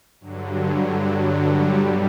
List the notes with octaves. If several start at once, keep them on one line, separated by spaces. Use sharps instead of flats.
G2 D3 F#3
F#3
G3
B2 G3